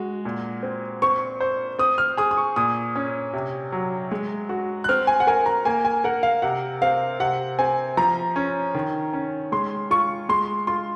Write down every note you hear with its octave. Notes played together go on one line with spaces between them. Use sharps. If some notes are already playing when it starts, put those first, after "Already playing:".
Already playing: G#3 F#4
A#2
C4
C4 C#6
C5
C4 D#6
F6
G#4 D#6
D#6
C#6
A#2 D#6
C#4
C3
F#3
G#3
F#4
F#6
C4 F6
G#5
F#5
A#4 G#5
A#5
A#3 G#5
G#5
A#4 F#5
F5
C3 F#5
C4 F5
C3 F#5
C4 G#5
F3 A#5
C#4
D#3
C#4
G#3 C6
F4 C#6
G#3 C6
F4 C6